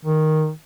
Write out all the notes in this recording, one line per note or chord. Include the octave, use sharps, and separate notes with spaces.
D#3